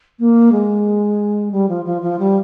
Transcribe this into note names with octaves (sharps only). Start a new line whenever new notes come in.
A#3
G#3
G3
F3
F3
F3
G3